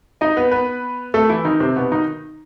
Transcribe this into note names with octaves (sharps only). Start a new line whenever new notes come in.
D#4 D#5
B3 B4
B3 B4
A3 A4
E3 E4
D#3 D#4
C3 C4
B2 B3
D#3 D#4